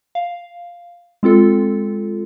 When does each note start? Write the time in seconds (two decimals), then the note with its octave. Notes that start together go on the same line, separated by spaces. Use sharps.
0.15 F5
1.23 G#3 C4 F4 A4